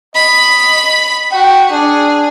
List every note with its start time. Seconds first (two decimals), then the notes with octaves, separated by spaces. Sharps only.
0.16 D#5 B5
1.32 F#4 G5
1.71 D4 G#4